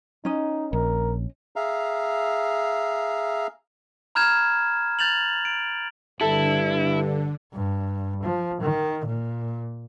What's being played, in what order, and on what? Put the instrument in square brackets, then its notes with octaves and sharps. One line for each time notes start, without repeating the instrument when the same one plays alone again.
[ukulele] C#4 D#5 [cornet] D#4
[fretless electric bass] A#1 [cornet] A#4
[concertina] G#4 E5 F5 A#5
[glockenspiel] A#5 B5 F6 G6 G#6 E7
G6 A6 F7 F#7
D7
[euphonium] G2 [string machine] D3 [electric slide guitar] E4 [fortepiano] A4
[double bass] G2
F3
D#3
A#2